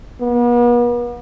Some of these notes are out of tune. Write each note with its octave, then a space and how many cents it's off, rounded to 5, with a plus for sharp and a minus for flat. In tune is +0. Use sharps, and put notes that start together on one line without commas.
B3 -45